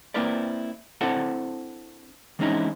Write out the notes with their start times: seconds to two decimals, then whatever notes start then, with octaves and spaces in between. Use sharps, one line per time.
0.14 A#3 C4 E4 A#4 B4 D5
1.01 C4 D4 E4 A4 E5 F#5
2.39 E3 G#3 C4 C#4 D#4 E4